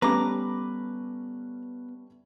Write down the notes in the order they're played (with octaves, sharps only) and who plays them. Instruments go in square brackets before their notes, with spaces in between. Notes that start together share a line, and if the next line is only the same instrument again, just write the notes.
[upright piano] G3 A3 C#4 [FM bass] B3 [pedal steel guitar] B4 D6 [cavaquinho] A#5